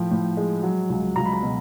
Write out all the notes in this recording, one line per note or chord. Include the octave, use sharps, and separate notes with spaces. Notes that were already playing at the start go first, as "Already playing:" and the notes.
Already playing: A2 F3 G5
A2
G#3
F#3
C#2
C#2 A#5
B5
A#5
B2